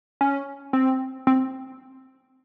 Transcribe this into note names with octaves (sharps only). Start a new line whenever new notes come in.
C#4
C4
C4